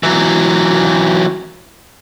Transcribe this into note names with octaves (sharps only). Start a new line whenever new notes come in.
E3 F#3